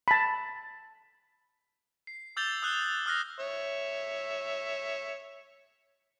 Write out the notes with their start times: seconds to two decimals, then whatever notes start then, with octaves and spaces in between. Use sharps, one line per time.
0.08 A5 B5
2.07 C7
2.36 D6 E6 G6 A6 F7 G7
2.62 D#6 E6 F#6 F7 G7
3.06 D#6 F6 F#6 A#6
3.40 C#5 E5